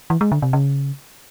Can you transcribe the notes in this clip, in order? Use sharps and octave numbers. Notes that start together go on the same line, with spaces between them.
E3
G#3
D3
C3
C#3